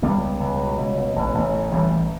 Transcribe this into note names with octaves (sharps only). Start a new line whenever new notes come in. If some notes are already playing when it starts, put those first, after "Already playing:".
C#2 G3 B3
C#2
C#2
B2
C#2
B2
A1
A1
A2
A1 E3 G3
A1